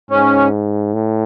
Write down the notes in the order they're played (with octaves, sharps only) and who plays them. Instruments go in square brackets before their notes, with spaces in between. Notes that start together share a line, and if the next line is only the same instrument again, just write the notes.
[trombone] G#2 [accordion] C#4
[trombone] A2